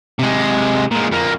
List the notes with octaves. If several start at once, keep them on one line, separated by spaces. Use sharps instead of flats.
C3 G#3
A#2 G#3
F2 A#3